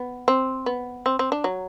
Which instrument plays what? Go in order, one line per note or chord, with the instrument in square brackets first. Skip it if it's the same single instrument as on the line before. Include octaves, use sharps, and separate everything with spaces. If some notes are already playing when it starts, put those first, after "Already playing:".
Already playing: [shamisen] B3
C4
B3
C4
C4
D4
F#3